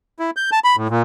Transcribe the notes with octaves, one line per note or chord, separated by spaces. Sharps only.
E4
G6
A5
B5
A2
A#2